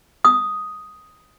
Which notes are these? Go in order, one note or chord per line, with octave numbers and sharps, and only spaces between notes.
D#6